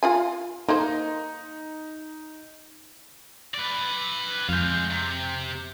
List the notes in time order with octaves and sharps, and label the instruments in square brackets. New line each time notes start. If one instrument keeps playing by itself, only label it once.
[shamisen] F4 F5 G#5
[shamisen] A#3 C5 [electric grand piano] D#4
[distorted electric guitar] B4 D5
[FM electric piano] F2 G6 [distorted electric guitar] G#3 F5
[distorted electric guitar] C3